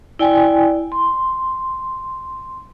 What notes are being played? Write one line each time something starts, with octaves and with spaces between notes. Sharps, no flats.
E4 D5 G5 G#5
C6